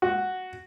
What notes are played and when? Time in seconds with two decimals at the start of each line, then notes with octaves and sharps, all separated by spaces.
0.02 F#4